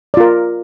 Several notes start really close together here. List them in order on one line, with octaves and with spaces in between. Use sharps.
D5 F4 A#4